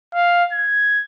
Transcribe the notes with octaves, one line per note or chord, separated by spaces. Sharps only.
F5
G#6